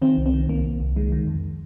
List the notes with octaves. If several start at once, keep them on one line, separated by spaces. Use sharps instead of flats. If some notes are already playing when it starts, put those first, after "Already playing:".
D#3 C4
C2
C4
D#3
C2 A#3
C2
C2
D#3 G#3
D#3
F2